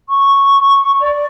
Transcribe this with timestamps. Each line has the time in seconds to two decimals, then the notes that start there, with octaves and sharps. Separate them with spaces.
0.09 C#6
1.00 D5